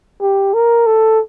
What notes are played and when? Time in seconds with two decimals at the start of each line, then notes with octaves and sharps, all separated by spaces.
0.22 G4
0.54 A#4
0.86 A4